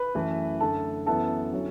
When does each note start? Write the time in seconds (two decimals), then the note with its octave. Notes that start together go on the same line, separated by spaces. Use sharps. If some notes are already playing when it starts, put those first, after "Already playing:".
Already playing: B4 B5
0.15 F#2 E3 A3 E4
0.60 F#2 D3 A3 A4 A5
1.06 F#2 E3 B3 E4 A4 A5
1.53 D3 F#3 C#4 E4